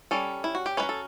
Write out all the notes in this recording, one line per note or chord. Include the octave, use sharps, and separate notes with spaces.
G3 C#4 A4
E4
F#4
G4
A3 C#4 B4
F#3
A4